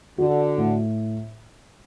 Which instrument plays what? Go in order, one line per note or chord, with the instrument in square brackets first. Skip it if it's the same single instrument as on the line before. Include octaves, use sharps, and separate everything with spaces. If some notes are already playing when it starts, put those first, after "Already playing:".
[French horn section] D3 [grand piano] F#4
[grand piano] A2